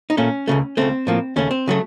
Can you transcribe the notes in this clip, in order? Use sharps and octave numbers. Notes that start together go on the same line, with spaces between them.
D#4
A#2 A3 C#4
C#2 C#3 A3
C#2 C#3 A3 C4
A2 F3 A#3
D#2 C#3 A3 C#4
C4
C#3 F#3 A3